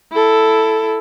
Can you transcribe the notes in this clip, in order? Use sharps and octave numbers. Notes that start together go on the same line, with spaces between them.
E4 A4